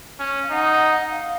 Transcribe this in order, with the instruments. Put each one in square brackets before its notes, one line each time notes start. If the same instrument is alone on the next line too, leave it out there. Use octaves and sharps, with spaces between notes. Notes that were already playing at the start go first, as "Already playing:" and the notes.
[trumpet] C#4
[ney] F5
[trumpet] D#4 [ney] F#5
[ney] F5